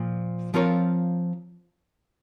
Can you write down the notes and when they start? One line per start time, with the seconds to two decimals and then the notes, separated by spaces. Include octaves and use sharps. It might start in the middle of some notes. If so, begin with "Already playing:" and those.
Already playing: A#2 F3
0.54 F3 C4 F4 A#4 C#5